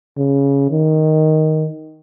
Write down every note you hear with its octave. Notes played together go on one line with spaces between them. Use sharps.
C#3
D#3